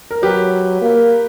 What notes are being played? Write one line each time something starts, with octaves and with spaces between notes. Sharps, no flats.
A#4
F#3 G4 B4
A#3